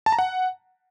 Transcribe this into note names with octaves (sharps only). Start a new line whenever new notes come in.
A5
A#5
F#5